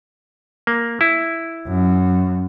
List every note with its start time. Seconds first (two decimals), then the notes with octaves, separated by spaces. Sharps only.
0.67 A#3
1.01 E4
1.67 F#2